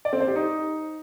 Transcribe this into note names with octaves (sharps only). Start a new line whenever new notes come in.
D5
C4
C5
G4
D#4